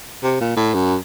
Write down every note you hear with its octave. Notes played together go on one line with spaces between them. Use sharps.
C3
A#2
A2
F#2